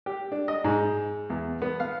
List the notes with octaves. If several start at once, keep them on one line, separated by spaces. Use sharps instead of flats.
G4
D4
D#5
G#2
E2
B3
F5